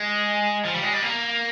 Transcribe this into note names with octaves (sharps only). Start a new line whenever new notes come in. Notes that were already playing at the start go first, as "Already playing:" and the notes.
Already playing: G#3
F3
G3
G#3
G3
A#3